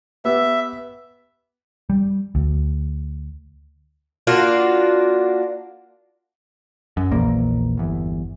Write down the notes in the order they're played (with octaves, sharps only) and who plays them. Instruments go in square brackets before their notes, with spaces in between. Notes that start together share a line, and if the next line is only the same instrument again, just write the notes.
[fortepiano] B3 G4 [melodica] E5
[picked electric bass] G3
D2
[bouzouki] A#3 D4 F4 F#4
[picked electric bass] F#2
A#1 E2 A#2 A#3
G1 E2